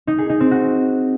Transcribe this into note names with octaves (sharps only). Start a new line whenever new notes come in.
D#4
G#4
D#4
C4
F#4